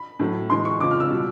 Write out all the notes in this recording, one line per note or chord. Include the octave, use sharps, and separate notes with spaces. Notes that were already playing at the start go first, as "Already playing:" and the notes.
Already playing: B5
A2 F#3 A3
A2 E3 G#3 C6
C#6
F2 C#3 F3 G#3 D6
F6
E6
B2 G3